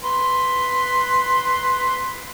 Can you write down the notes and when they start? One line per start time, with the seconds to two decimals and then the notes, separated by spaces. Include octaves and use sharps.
0.04 B4 C6